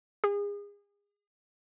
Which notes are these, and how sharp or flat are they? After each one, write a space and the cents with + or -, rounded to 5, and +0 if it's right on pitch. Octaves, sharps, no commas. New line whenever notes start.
G#4 -30